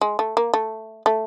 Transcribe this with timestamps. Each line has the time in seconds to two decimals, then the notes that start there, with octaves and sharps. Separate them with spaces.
0.01 G#3
0.19 A3
0.37 A#3
0.54 A3
1.06 A3